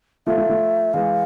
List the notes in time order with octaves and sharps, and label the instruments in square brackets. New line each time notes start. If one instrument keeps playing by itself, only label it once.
[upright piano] F3 A3 [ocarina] E5
[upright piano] F3 A3
F3 A3
[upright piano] E3 G#3 [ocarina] F5